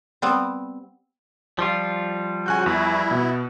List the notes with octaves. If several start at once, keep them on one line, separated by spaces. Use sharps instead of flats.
G3 B3 C4
F3 G3 F4
C#3 F#4 G#5 F#6 G6
E2 E4
B2 B3